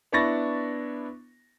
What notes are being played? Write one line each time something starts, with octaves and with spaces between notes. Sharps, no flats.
B3 D4 E4 C#6 A6 A#6